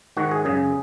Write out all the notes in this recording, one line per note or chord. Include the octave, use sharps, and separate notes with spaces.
G#2 D#3 F#4
G#4
F#2 C#3 G#4